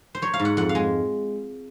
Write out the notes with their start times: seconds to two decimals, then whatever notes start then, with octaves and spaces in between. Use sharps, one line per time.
0.15 C5
0.22 F#3 C#5
0.34 F5
0.39 G#2
0.45 F#5
0.57 F2 F#5
0.69 F5
0.75 G#3